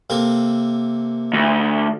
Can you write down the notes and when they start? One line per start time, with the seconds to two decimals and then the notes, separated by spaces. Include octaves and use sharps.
0.10 C3 A#3 A4
1.33 D2